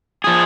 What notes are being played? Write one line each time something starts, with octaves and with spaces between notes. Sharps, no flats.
F3 G#4